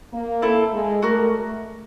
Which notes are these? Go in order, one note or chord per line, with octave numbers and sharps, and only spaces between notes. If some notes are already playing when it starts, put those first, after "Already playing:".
A#3
C4 E4 A4
G#3
A3 F#4 A#4 D5